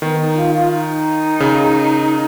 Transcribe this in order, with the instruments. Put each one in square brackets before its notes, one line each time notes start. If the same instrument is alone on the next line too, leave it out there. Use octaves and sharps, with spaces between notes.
[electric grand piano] D#3 [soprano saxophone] B3
[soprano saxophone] D#4
F4
F4
D#4
[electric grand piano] C#3